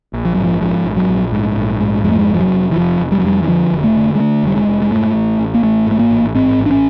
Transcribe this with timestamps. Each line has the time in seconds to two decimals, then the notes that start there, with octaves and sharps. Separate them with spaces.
0.13 A#1
0.25 F3
0.34 G#2 F#3
0.44 F3
0.61 G#2 F3
0.85 A#1
0.97 F#3
1.09 A#1
1.32 G#2
1.57 A#1
1.80 G#2
2.04 F2 G#3
2.11 A3
2.19 G#3
2.28 F1
2.34 F3
2.40 F#3
2.52 F1
2.71 E3
2.76 F1 F3
3.00 F1
3.12 G3
3.19 F#3
3.24 F2 G3
3.42 E3
3.48 D3 F3
3.72 F1
3.84 A3
3.96 D3
4.15 G#3
4.20 D3 A3
4.43 F1 G3
4.56 G#3
4.67 F1
4.82 G#3
4.91 G#2 A3
5.15 A1
5.39 A1
5.54 A#3
5.63 A1 A3
5.87 G#2 A3
5.99 A#3
6.11 A1
6.35 G#2 C4
6.59 A1
6.66 D4
6.71 C#4